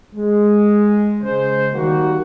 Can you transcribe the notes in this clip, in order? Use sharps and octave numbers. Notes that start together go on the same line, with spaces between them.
G#3
C#3 G#3 C5
D#3 G3 A#3 F#4